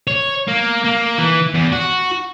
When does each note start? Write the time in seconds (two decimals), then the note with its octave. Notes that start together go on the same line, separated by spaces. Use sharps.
0.07 C#5
0.48 A#3
0.85 A#3
1.18 E3
1.54 E2
1.72 F#4